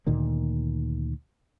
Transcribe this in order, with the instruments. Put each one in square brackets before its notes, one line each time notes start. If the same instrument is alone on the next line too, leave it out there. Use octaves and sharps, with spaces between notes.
[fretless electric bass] D2 A#2 D#3 A#3